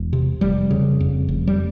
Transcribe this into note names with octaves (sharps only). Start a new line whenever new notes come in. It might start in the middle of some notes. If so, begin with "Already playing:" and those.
Already playing: E1
C3
F1 G3
C#3
F2
F1
G3